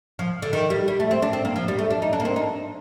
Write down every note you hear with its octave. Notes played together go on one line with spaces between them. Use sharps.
F3
D3
D#3
G3
G3
A3
C4
D4
C4
A#3
F3
G3
A3
D4
D#4
D4
A#3
C4
D#4